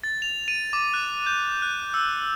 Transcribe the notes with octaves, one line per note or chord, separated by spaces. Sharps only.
A6
F7
D#7
D6
F#6
G6
F#6
E6